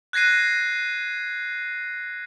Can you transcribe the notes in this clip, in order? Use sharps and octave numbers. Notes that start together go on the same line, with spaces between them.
F#6 G#6 A#6 C7 D#7